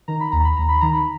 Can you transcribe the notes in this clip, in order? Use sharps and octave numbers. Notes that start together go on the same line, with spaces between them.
D#3 A#5
B5
D#2 A#5
B5
D#2 A#5
B5
D#3 A#5
B5